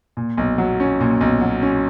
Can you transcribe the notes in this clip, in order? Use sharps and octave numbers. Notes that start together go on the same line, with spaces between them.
A#2
B1
F#3
C#4
A#2
B1
F#3
C#4